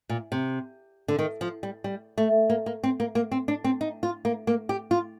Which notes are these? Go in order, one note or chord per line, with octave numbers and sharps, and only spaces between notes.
A#2
C3
D3
D#3
F3
G3
G3
A3
A#3
A#3
C4
A#3
A#3
C4
D4
C4
D#4
F4
A#3
A#3
G4
F4